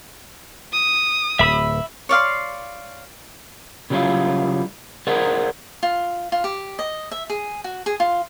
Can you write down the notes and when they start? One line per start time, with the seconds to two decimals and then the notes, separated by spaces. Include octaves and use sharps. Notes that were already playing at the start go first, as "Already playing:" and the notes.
0.73 D#6
1.39 D1 E5 B5 E6
2.09 C#5 D5 F5 C6
3.90 C#3 F#3 G3 A#3 E4 F4
5.07 G#4 A#4 C5 D5 F#5
5.83 F4
6.32 F4
6.44 G4
6.79 D#5
7.12 E5
7.30 G#4
7.64 F#4
7.86 G#4
8.00 F4